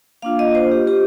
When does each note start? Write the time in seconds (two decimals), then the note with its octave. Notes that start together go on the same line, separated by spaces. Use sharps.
0.22 A#3 D4 F4 F5
0.39 D#5
0.55 C5
0.72 G4
0.87 F4 G4